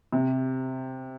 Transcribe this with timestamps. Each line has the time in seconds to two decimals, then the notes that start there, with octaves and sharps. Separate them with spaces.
0.12 C3